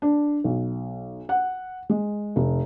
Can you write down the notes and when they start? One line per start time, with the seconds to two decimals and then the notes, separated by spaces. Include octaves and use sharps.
0.02 D4
0.44 B1
1.29 F#5
1.89 G#3
2.36 F1